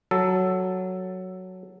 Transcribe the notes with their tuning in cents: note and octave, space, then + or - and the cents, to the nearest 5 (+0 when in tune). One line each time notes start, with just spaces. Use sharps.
F#3 +0 A4 +0